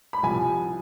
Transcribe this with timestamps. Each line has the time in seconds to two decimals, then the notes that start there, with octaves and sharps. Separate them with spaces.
0.13 B5
0.23 C2 C3 F3 G#5